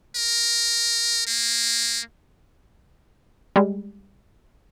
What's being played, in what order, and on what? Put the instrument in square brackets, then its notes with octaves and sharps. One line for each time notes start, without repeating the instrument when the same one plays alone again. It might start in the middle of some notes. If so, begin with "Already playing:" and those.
[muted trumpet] A#4
A#3
[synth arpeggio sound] G3 G#3